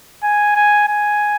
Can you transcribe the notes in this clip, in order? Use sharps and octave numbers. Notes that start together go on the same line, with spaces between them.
G#5
G#5
G#5